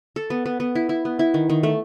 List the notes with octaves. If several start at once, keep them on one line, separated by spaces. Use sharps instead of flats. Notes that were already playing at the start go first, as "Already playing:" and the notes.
A4
B3
B3
B3
E4
E4
B3
E4
D#3
D#3
A3